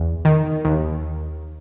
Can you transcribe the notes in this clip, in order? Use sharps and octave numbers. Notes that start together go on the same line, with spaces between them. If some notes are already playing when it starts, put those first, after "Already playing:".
Already playing: E2
D#3
D#2